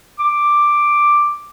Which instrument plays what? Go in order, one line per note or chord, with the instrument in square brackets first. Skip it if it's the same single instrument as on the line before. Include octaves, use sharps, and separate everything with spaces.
[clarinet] D6